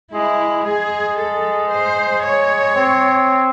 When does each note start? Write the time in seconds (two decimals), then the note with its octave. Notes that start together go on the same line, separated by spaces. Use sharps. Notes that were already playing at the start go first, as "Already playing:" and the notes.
0.13 G#3 E4
0.67 G#3 G#4
1.19 A4
1.71 C5
2.23 C#5
2.75 C4